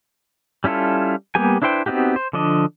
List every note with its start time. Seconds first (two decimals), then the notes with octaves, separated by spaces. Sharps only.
0.64 G3 C#4 E4 F4 A4
1.35 G3 A#3 B3 G4 G#5
1.62 D4 E4 B4 C5 G5
1.86 B3 C4 D#4 F#4 G4
2.16 C5
2.33 D3 F3 D4 D#5